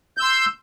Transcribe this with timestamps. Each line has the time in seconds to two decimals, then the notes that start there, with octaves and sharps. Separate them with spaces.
0.17 G6
0.20 E6
0.23 C6